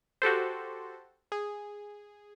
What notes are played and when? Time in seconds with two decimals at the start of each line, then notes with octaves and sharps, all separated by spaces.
0.22 F#4 G4 A4 C5
1.32 G#4